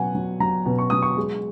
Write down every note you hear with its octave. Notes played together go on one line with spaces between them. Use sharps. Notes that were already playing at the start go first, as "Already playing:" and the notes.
Already playing: B2 F#3 F#5 G#5
F#3
F#3 A#5
B2
C#6
F#3 D#6
C#6
G#3